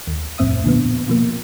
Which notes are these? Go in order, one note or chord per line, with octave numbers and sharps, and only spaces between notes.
D#2
C2 F2 A2 C4 E5 D#6
A#2 D3 F3 B3
B2 F3 A#3